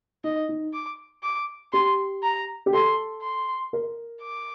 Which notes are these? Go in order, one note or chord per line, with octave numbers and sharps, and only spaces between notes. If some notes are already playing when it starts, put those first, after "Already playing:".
D#4 D#5
D#4
D6
D6
G4 C6
A#5
G4
A4 C6
C6
A#4
D6